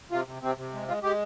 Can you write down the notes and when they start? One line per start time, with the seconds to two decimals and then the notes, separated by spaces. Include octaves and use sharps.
0.12 C3 F4
0.27 C3
0.42 C3 C4
0.57 C3
0.73 G#3
0.88 G#3 F4
1.03 G#3 G4